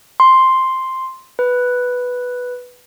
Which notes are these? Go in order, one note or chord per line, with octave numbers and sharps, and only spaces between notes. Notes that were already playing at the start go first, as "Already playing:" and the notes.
C6
B4